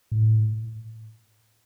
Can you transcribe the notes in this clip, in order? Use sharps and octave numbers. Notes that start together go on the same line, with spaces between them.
A2